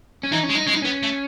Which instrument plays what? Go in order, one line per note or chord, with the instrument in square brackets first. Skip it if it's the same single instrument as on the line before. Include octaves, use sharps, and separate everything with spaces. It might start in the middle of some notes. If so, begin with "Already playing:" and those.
[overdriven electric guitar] C#4
[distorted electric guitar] E3 [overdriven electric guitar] D#4
[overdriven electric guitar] C#4
[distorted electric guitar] G#3
[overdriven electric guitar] D#4
[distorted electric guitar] G#3 [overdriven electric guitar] C#4
[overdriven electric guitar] D#4
[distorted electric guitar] B3 [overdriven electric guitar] C#4
[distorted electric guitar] A3